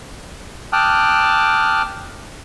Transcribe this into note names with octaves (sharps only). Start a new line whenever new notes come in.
G5 A5 D6 D#6 F6 F#6